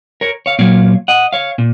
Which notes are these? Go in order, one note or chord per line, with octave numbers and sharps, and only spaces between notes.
A#4 C#5
C#5 F5
A#2 F#3 A#3 C#5 F5
D#5 F#5
C#5 F5
A#2